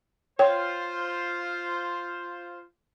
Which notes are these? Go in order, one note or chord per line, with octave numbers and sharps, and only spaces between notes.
F4 C5 C#5 G5